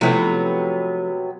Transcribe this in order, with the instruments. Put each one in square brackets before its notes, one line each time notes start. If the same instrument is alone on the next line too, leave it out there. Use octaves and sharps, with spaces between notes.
[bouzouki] C3 F#3 B3 [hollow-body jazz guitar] F3 A3 E4